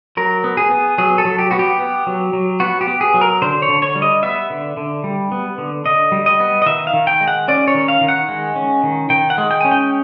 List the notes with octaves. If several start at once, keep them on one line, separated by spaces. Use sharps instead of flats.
F#3 A#4
B3
G#4
B3
F#3 G#4
A4
F#3
G4
B3 F#4
G4
B3
F#3
F#3
B3 F#4
G4
B3
G#4
F#3
A#4
D3 C5
C#5
D3
C#5
G3
D#5
B3 E5
D3
D3
G3
B3
D3
D3 D#5
G3
D#5
B3
D#5
D#3 E5
F5
D#3
G5
G#3
F#5
C#4 D5
C#5
D#3
F5
D#3
F#5
G#3
C#4
D#3
D#3 G5
F#5
G#3
G5
C#4 G#5
G5